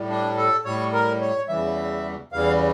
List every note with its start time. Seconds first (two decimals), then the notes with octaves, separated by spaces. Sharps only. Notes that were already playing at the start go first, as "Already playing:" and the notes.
Already playing: A2 G3
0.10 D4
0.38 A4
0.65 A2 G3 C#5
0.93 A#4
1.21 C#5
1.48 E2 C#3 E3 G3 E5
2.32 E2 C#3 E3 G3 F5